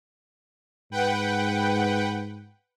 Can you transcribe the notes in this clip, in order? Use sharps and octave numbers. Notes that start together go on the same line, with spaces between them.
G#2 B4 F#5 G5